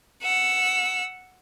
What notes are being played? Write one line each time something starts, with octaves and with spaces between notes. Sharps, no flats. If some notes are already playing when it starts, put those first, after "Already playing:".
F#5 E6